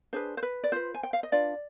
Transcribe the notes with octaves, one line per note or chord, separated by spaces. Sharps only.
D4 G#4 B4 C5
C5
B4
D5
F4 B4 C5
G#5
G5
F5
D#5
D4 F4 B4 D5